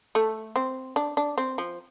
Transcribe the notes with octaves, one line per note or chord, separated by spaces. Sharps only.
A3
C4
D4
D4
C4
F3